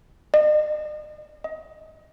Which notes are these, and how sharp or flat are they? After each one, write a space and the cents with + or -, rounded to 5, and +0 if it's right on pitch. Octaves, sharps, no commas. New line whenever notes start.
D#5 -40
D#5 +30